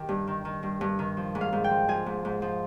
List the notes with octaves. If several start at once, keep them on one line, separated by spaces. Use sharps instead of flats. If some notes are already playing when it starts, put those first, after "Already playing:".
Already playing: D#3 G4
G2
D#3
D#3
G2
G2
D#3
F3
G#2
F5
G#2
G5
F3
F3 G#5
G#2
G#2
F3